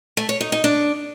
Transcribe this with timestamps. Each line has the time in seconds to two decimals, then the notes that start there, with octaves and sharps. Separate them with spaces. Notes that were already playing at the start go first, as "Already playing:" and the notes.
0.17 A3
0.29 C#5
0.41 D#4
0.52 D#4
0.64 D4